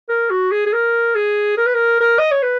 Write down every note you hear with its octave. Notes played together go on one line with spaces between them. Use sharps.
A#4
F#4
G#4
G#4
A#4
G#4
A#4
B4
A#4
A#4
D#5
C#5
B4